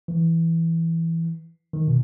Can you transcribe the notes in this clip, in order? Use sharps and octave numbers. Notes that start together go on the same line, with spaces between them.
E3
D#3
B2